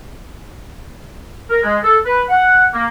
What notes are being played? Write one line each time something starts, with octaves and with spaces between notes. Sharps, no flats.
A#4
G#3
A4
B4
F#5
A#3